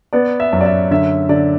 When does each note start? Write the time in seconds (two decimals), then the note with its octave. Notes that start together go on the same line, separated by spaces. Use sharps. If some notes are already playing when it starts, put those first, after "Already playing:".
0.13 B3 D5
0.40 E5
0.53 F#2
0.61 D5
0.65 E5
0.91 D3 E5
1.29 D3 D5